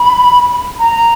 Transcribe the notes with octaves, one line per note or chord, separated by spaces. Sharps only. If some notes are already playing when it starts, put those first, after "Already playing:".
Already playing: B5
A#5